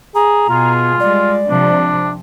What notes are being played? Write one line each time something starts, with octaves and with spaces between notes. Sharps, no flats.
G#4 A#5
B2 F4 G#4
G3 G#3 D5
C3 F3 D4